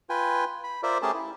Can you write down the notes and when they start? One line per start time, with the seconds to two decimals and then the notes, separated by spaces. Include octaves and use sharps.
0.10 F4 B4 G5 G#5
0.64 B5
0.83 F4 A#4 C5 D5 E5
1.02 A3 C#4 G4 G#4 A#4 A5
1.14 E4